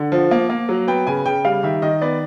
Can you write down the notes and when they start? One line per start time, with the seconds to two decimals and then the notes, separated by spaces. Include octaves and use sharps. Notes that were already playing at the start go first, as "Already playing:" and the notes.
Already playing: D3 F#5
0.12 F3
0.31 A#3
0.50 A#3
0.69 F#3
0.88 B3 G5
1.07 C#3 G#5
1.26 C#3 G5
1.45 G3 F5
1.63 D#3 E5
1.82 D#3 D#5
2.02 B3 D5